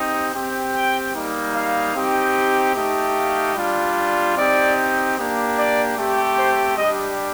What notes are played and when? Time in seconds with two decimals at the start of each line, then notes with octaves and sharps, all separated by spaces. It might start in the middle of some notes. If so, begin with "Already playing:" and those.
Already playing: C4 D#4 G4
0.33 C4 G4
0.74 G5
1.14 G3 A#3 D#4
1.55 F5
1.95 C4 D#4 G4
2.75 A3 D#4 G4
3.16 F5
3.56 G3 D4 F4
4.36 C4 D#4 G4 D5
5.17 A#3 D4 G4
5.58 D5
5.98 A3 C4 G4
6.38 C5
6.78 G3 D4 G4 D#5